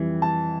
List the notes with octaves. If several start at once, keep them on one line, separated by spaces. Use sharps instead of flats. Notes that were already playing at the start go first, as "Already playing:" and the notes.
Already playing: F2 E3 G3
A5